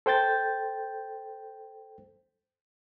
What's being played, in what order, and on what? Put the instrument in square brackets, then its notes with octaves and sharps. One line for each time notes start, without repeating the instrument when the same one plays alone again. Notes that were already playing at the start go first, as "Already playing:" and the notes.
[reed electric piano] A4 C5 G5 G6 A6